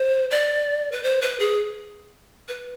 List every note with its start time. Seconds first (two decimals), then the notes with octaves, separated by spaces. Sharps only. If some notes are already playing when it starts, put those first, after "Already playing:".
Already playing: C5
0.31 D5
0.92 B4
1.03 C5
1.22 B4
1.40 G#4
2.48 B4